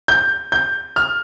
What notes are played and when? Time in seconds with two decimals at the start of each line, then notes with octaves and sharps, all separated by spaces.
0.08 G6
0.52 G6
0.96 F6